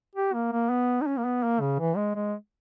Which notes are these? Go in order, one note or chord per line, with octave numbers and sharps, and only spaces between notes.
G4
A#3
A#3
B3
D#4
C#4
A#3
B3
A#3
C#3
E3
G#3
G#3